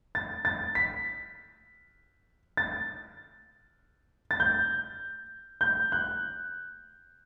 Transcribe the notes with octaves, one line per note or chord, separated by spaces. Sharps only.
A6
A6
B6
A6
A6
G6
G6
F#6